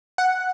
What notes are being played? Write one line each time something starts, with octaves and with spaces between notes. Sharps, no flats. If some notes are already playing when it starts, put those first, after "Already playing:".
F#5